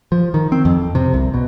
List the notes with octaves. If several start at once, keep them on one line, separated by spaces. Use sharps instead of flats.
F3
D#3
C4
F2
C3
C2
B2